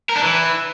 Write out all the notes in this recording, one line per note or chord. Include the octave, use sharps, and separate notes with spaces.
A#4
D4
E3